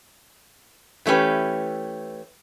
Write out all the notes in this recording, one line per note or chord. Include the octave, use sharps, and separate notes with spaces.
E3 A3 C#4 G4 B4